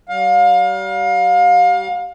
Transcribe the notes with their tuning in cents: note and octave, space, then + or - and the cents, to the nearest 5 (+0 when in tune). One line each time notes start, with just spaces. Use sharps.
G3 -35 F5 +30